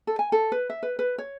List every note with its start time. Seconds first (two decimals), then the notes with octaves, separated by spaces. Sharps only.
0.07 A4
0.19 G#5
0.32 A4
0.52 B4
0.70 E5
0.83 B4
0.99 B4
1.18 C#5